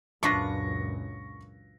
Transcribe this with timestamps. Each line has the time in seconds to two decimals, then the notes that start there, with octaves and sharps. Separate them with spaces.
0.23 C#2 F#2 A#2 D4 F4 B4 C#6 A#6